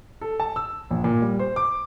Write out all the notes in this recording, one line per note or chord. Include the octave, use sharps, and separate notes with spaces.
A4
A5
E6
A#1
A#2
G3
C5
D6